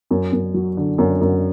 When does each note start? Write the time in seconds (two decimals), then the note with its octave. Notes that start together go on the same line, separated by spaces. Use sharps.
0.11 F#2
0.33 F#2
0.54 F#3
0.77 D3
0.98 F#2
1.21 F#2